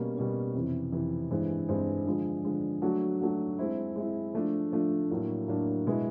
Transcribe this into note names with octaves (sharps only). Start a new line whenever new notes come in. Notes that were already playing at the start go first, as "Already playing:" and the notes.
Already playing: B2 G3 A#3 C#4
B2 G3 A#3 C#4
F2 C3 E3
F2 C3 E3
G2 E3 G#3 C4
G2 E3 G#3 C4
D3 F3 G#3
D3 F3 G#3
F#3 A3 D4 F#4
F#3 A3 D4 F#4
G#3 C4 E4
G#3 C4 E4
F3 A3 D4
F3 A3 D4
A2 F#3 A#3 D4
A2 F#3 A#3 D4
B2 G#3 B3 E4